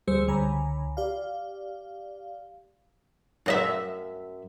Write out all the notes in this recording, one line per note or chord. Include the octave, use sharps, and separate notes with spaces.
D2 G3 G#4 C5 E6 C#7
C#2 D3 G#5 A#5 B5
G4 D5 F5
F#2 D#5 E5